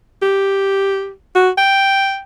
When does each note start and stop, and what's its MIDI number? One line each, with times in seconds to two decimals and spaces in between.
0.22 1.11 67
1.35 1.50 66
1.58 2.21 79